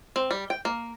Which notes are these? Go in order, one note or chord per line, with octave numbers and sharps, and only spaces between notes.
C4
G3
G5
A#3